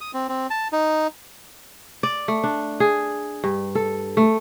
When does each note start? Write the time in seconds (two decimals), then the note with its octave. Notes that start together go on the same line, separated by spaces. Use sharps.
0.01 D#6
0.14 C4
0.29 C4
0.50 A5
0.72 D#4
2.03 D5
2.28 A3
2.44 D4
2.80 G#4
3.44 G2
3.75 A4
4.17 A3